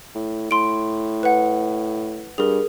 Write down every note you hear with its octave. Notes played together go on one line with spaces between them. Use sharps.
A2
A2 C6 D7
B4 F#5
G2 G#4 A#4